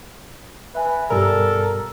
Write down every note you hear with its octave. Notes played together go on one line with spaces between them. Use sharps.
B4 E5 G#5
G2 B2 G4 A4 A#4 D5